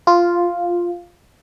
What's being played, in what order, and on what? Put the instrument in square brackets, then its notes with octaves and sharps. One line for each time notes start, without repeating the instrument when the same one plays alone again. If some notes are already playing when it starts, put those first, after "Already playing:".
[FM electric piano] F4